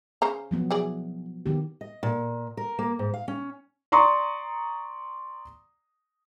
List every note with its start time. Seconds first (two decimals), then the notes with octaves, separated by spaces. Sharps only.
0.22 C#3 C5 A#5
0.51 F3 F#3 B3
0.71 E3 G#4 D5
1.46 D#3 B3 G4
1.81 D#5
2.03 A#2
2.57 A#4
2.79 A#3
2.99 G#2
3.14 F5
3.28 C#4
3.92 D5 A#5 C6 C#6 D#6